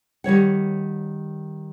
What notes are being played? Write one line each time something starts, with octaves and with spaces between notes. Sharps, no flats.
D#3 G3 C#5 F#5